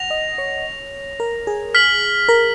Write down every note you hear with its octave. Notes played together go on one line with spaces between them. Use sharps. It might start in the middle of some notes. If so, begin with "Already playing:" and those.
Already playing: F#5 A#6 F7
D#5
C#5
A#4
G#4
F6 B6 F#7
A#4